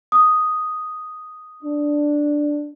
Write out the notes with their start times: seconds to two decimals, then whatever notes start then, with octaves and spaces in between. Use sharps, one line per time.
0.12 D#6
1.63 D4